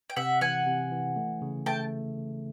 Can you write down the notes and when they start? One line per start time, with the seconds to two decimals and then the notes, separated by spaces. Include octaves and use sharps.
0.10 G5
0.16 C3 E5 F#5
0.41 E3 F#5 G#5
0.66 C3
0.92 E3
1.16 A3
1.42 C#3
1.66 A3 G5 A5